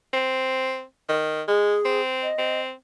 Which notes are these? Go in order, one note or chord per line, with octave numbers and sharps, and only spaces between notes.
C4
D#3
G#3 G#4
C4
D#5
C4